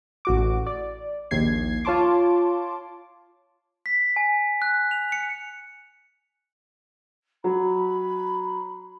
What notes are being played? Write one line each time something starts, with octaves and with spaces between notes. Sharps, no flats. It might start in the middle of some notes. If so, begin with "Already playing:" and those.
A1 F#4 D6
D5
A#1 D#2 G#6 C7
F4 C#5 A5 C6 D6
B6
G#5
F#6
F7
C#7
F#3 B5